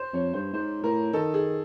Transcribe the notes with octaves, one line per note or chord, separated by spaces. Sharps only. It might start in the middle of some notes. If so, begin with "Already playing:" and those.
Already playing: C5
F2 C#5
G2 C5
G#2 C5
A2 A#4
D#3 A4
G#4